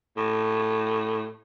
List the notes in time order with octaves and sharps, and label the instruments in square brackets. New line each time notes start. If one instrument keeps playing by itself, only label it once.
[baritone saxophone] A2